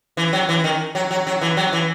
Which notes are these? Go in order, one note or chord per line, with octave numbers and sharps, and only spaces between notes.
E3
F#3
E3
D#3
F#3
F#3
F#3
E3
F#3
E3